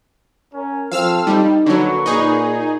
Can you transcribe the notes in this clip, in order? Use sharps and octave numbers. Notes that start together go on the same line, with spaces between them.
C#4 A#4
F3 C4 A4 F5 E6 F6
G3 D#4
D3 F#3 A#3 B4 C#6
A#2 D#4 G#4